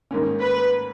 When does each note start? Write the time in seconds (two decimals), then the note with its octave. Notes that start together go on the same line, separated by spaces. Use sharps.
0.11 G#2 D#3 A#3 C#4
0.40 B4